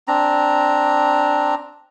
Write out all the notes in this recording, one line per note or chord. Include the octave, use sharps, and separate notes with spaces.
C4 D4 A#5